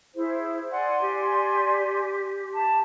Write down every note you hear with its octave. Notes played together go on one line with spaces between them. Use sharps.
E4 G#4 C5
D5 F#5 G#5 C6
G4
A5